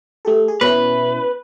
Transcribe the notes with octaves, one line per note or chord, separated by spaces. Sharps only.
A3 G4 A4
G#4
B2 C#4 E4 B4